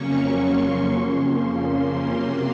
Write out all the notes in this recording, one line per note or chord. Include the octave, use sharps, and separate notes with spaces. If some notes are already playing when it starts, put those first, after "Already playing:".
Already playing: F2 C#3 F#3 A#3 C#4 C#6
C6
F2 C#3 F3 A#3 C#4
C3 F#3 A#3